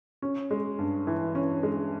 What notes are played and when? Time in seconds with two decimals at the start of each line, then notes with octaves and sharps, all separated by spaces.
0.22 C#4
0.51 G#3
0.79 G2
1.07 E3
1.35 C#4
1.63 G#3